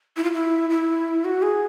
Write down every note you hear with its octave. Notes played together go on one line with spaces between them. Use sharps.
E4
F4
E4
E4
F#4
G#4